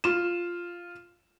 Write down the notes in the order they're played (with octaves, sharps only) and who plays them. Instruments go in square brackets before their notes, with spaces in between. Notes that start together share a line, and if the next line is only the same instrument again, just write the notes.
[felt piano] F4 E7